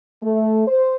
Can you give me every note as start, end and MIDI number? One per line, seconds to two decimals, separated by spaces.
0.23 0.63 57
0.67 0.95 72